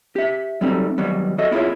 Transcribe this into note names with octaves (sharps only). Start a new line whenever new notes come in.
G4 E5
F#3 G3 A3 C4 D#4
D#3 F#3 G3 B3
F#4 A4 D#5 E5
B3 E4 F4 G#4 C#5